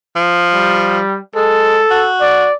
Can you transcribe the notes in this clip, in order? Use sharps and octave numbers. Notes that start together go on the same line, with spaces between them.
F3
G3
G#3 A4
F#4
D5